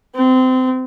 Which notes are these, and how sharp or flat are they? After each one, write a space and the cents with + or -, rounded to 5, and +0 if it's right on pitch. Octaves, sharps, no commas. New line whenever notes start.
C4 -25